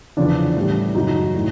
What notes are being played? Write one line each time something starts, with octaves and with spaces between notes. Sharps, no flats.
E2 C#3 F3 D4
A2 E3 G3
F#2 C#3 F#3 D#4
A2